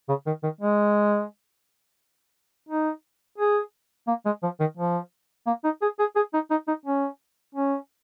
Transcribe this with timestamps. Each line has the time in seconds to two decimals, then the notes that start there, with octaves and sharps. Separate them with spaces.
0.09 C#3
0.26 D#3
0.43 D#3
0.61 G#3
2.69 D#4
3.38 G#4
4.07 A#3
4.26 G#3
4.43 F3
4.60 D#3
4.77 F3
5.47 A#3
5.64 D#4
5.82 G#4
5.99 G#4
6.16 G#4
6.33 D#4
6.50 D#4
6.68 D#4
6.86 C#4
7.55 C#4